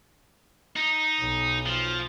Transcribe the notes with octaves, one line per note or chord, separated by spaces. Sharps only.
D#4
B1
F3